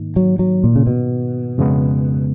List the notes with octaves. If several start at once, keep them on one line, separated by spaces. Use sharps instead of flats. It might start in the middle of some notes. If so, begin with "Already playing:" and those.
Already playing: G#2 D#3 A#3 D#4
F#3
F#3
A#2
C#3
B2
F2 C#3 G#3 B3